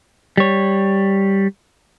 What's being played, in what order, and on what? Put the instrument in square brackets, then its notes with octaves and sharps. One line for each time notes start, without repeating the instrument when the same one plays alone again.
[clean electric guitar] G3 C#5